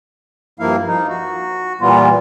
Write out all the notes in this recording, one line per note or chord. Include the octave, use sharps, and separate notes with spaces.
G2 F3 A#3 E4 F5
F3 D#4
F#4
A#2 E3 G3 B3 F4